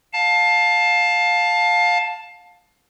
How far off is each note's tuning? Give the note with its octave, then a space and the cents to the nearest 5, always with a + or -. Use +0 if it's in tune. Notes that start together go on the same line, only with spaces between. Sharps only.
F5 +20 A5 +0